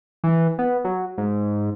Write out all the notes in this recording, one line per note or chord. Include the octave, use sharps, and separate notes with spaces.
E3
B3
F#3
G#2